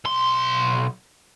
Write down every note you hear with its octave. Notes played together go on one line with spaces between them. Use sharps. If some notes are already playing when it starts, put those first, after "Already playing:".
B1 C6